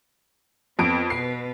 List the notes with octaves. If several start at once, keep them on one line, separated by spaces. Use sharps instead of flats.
F2 B3 C4 D7
B2 B4 C7